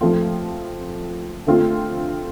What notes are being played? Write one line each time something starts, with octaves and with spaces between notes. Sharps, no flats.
F3 A3 C4 F4
D3 A3 C4 F4